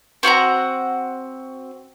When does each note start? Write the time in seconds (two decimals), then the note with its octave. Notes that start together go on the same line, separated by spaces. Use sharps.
0.23 C4 F#4 F#5 A#5